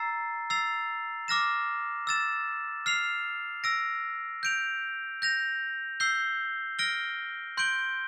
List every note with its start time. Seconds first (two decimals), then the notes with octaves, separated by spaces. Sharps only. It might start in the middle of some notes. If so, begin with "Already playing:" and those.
Already playing: A#5 E6 A6 C7
0.50 E6 A6 C7 F7
1.28 D6 F6 A#6 E7
2.07 E6 A6 E7
2.86 F6 C7 F7
3.64 E6 A#6 D7
4.43 G6 D7 F7
5.22 G6 A#6 F7
6.00 E6 G6 C7 G7
6.79 F6 A#6 D7 G7
7.57 C6 G6 D7 G7